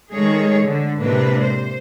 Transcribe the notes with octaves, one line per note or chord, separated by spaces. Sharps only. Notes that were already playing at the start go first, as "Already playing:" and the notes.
D#3 G#3 A3 G#4 C#5
D3
A2 C3 G#3 A#3 D4 B4
C5